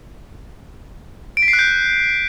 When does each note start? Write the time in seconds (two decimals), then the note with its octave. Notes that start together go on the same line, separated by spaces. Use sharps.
1.37 D7
1.42 B6
1.48 C7
1.53 F#6
1.59 G6